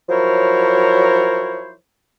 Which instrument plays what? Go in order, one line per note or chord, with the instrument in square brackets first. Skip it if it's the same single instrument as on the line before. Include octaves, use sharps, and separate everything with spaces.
[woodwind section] F3 F#3 E4 A#4 C5 C#5